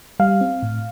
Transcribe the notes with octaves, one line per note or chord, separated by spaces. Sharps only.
G3 F5
C4
A2